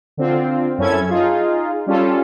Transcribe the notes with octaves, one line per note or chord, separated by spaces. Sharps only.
D3 C4 F4
F#2 C#4 E4 A4 G#6
D#4 F4 G#4
G3 C#4 F4 A4